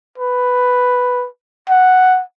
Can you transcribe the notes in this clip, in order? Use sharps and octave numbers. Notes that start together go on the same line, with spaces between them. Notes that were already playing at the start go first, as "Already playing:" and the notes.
B4
F#5